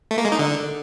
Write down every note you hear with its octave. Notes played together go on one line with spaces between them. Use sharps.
A3
A#3
G#3
D#4
D3